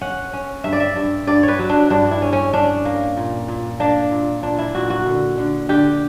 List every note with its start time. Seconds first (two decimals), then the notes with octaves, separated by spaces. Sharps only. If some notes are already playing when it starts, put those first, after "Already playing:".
0.01 C#4 F#5
0.33 C#4
0.64 G2 E5
0.73 D5
0.80 E5
0.96 G2
1.27 G2 D5
1.43 C#5
1.48 B4
1.59 F#3
1.69 D4
1.90 G2 D4
2.11 E4
2.22 C#4
2.33 C#4
2.53 C#4 D4
2.85 A#3
3.17 A#2
3.48 A#2
3.80 A#3 D4
4.11 A#2
4.43 A#2 D4
4.59 E4
4.75 A#2 F#4
4.90 F#4
5.06 D3
5.38 D3
5.69 D3 G4